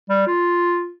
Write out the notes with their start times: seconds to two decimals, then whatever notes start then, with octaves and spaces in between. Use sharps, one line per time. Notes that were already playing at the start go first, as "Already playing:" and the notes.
0.09 G3
0.27 F4